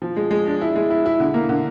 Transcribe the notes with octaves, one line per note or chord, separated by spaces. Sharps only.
F3
G#3
G#3
D4
E4
G#3
E4
E4
D3
A#3
D3